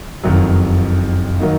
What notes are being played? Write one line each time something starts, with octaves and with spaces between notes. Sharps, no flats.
F#1 F2 D#3 F#3
D#3 F#3 A#3 D#4